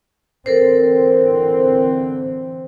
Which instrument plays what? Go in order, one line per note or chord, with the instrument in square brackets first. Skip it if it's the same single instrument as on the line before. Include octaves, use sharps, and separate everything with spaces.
[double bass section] D3 E3 C4 [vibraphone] A4 A#4 C5